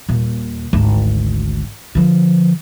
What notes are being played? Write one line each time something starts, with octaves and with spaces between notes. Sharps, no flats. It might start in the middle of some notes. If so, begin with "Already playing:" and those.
D#1 A#2
G#1 D2
D3 F3